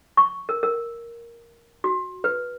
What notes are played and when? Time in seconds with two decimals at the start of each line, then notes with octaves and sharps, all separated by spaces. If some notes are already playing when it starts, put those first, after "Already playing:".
0.17 C#6
0.49 A#4
0.63 A#4
1.84 F#4
2.24 B4